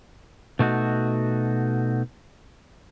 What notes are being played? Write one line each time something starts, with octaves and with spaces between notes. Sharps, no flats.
B2 A3 D#4 F#4